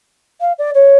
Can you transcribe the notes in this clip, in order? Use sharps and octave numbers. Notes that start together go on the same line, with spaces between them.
F5
D5
C#5